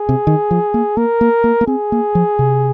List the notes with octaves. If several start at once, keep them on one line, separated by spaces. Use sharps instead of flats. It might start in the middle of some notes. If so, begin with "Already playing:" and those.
Already playing: G#4
C3
D#3
F3
A#3
A#3 A#4
A#3
A#3
A#3
C4 G#4
A#3
F3
C3